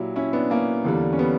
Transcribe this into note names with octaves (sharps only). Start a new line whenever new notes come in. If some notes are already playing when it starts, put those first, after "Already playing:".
Already playing: A#2 F#3 E4 G4
C#4 E4
B3 D4
A#3 C#4
E2 D3 G3
C#4
G3 B3